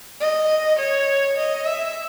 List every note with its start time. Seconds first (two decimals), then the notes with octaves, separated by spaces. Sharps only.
0.21 D#5
0.79 C#5
1.37 D#5
1.65 E5